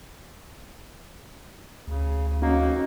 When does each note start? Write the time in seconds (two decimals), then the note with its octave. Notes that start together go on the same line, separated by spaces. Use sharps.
1.88 D2 C#3
2.42 F2 A#3 C#4 D#4 F#4 C#5